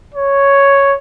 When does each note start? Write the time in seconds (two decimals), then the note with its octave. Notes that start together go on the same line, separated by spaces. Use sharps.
0.15 C#5